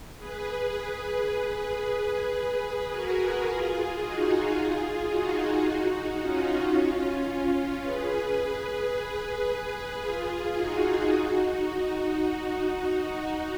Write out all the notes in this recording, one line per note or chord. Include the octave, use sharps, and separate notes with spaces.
G#4 B4
G#4 B4
F#4 A#4
F4 G#4
D#4 F#4
F4 G#4
D#4 F#4
C#4 F4
G#4 B4
G#4 B4
F4 G#4
D#4 F#4
D#4 F#4
D#4 F#4